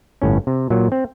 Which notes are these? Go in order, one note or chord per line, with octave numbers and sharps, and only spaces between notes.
G1 A2 C#4
C3
A#2 F#3
C4